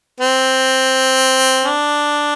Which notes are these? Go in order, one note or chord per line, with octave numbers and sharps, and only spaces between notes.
C4
D4